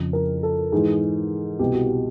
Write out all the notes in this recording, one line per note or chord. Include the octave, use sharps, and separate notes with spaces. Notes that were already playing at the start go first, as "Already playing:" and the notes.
Already playing: F2 C#3 F3
A#4
A4
G#2 E3 G#4
C2 B2 G4
F#4
G4